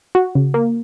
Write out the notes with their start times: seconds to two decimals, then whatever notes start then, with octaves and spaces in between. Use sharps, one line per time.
0.15 F#4
0.35 C#3
0.54 A#3